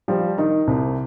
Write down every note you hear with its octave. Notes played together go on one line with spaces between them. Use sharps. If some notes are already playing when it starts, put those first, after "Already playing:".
F3 G3
D#3 D#4
C2 C3